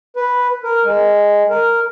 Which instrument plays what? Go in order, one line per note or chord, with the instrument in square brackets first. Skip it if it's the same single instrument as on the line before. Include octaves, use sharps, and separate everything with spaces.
[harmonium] B4
A#4
G#3
A#4